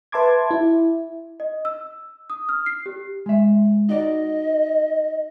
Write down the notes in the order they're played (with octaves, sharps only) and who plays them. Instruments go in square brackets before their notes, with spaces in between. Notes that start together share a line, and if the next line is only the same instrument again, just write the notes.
[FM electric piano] B4 E5 A5 C6 D6 G#6
E4
[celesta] D#5
E6
D#6
F6
C7
G4
[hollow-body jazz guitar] G#3 E5
[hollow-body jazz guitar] D#4 F#4 D5 [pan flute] D#5